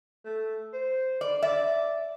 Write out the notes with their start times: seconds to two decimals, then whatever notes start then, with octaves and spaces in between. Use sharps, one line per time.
0.25 A3
0.73 C5
1.21 D5
1.43 D5 E5